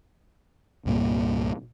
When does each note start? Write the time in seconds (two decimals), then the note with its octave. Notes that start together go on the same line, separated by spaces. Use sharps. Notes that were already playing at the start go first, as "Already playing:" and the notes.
0.86 C2 G2 A#2 A#3